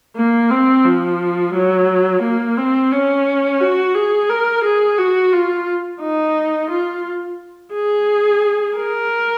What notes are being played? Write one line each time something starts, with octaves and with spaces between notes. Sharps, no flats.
A#3
C4
F3
F#3
A#3
C4
C#4
F#4
G#4
A#4
G#4
F#4
F4
D#4
F4
G#4
A#4